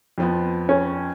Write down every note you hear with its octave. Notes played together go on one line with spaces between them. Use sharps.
F2 F3 B3
C#4